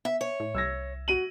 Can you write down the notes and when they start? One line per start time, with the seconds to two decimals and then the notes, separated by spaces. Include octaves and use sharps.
0.05 B3 E5
0.21 C#5
0.40 A2
0.55 C2 E6 G#6 A#6
1.08 F#4 D#7 F#7